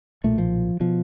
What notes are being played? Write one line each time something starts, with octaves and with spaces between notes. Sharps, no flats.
B1 A#2 A3
F3
B2 F3